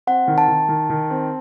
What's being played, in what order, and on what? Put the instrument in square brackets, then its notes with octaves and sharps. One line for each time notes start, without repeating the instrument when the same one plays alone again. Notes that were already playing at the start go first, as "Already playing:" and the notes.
[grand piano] C4 [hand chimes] F#5
[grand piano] D#3
[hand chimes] A5
[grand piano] D#3
D#3
D#3
C4